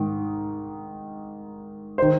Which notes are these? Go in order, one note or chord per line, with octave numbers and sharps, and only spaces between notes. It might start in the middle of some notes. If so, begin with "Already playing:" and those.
Already playing: G#2 D#3
D#3 C5